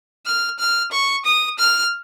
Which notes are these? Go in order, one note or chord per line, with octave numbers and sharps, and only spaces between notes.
F6
F6
C#6
D#6
F6